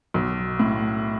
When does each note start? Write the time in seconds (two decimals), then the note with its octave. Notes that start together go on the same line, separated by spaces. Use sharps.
0.14 B1
0.59 A2